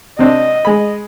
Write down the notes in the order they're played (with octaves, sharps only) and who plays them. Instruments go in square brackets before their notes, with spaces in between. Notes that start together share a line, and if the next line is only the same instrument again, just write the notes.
[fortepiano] C3 C4 D4 [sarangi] D#5
[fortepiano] G#3 B5